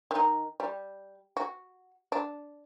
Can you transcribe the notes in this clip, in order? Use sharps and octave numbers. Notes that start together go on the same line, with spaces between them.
D#3 D#4
G3
F#4
D4